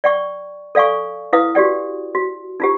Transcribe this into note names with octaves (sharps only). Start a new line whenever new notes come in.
D5 G5 C#6
A4 D5 F5 G#5 C#6
E4 B4 F5 D#6
F#4 G4 D5 G5
F#4
D#4 F4 G4